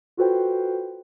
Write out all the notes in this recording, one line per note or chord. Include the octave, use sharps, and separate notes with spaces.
F4 F#4 A4 B4 C5 G5